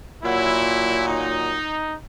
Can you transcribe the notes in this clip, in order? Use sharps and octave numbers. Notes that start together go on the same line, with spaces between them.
A#2 F#3 E4
D#4